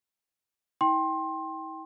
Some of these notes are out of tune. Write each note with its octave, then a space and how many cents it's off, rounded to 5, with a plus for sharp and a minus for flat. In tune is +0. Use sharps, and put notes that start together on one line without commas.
E4 -45 G5 +0 C6 +20